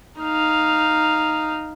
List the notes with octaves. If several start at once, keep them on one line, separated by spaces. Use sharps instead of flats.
D#4 F5